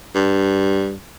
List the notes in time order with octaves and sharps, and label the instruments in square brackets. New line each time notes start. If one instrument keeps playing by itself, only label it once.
[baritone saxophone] G2